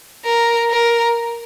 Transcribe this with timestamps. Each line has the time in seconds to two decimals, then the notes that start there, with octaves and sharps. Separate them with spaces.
0.25 A#4
0.70 A#4